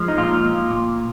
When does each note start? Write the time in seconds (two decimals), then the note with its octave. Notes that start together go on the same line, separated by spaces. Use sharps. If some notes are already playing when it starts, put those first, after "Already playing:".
Already playing: F3 G#3
0.08 D#4
0.18 A#2 F4
0.45 A#2
0.71 A#2